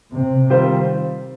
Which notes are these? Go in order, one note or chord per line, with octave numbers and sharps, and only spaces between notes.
C3
D#3 G3 C4 F4 C5